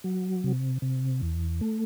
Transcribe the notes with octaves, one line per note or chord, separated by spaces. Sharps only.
F#3
C3
C3
E2
A3